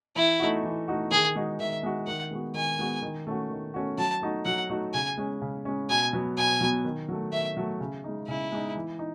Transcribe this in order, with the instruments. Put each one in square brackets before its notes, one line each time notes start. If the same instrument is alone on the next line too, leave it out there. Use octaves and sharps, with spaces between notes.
[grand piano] E3 [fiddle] E4
[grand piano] A3 D#4 F#4
E3
A3 D#4 F#4
[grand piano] D#3 [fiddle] G#4
[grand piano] G#3 D#4 F#4
[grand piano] D#3 [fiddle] E5
[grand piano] G#3 D#4 F#4
[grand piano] D#3 [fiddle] F#5
[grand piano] G#3 B3 F#4
[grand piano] D#3 [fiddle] G#5
[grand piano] G#3 B3 F#4
D#3
A3 C#4 F#4
D#3
A3 C#4 F#4
[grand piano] F#3 [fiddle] A5
[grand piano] A3 D#4 F#4
[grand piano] F#3 [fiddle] F#5
[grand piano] A3 D#4 F#4
[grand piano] C#3 [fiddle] G#5
[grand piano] G#3 C#4
C#3
G#3 C#4
[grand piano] B2 [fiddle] G#5
[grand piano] F#3 B3
[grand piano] B2 [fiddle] G#5
[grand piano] F#3 B3
D#3
F#3 A3
[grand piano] D#3 [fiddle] E5
[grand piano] F#3 A3
C#3
G#3 D#4
[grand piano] C#3 [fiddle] E4
[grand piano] G#3 D#4
E3
D#4